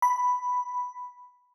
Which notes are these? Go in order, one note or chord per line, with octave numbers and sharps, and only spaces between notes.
B5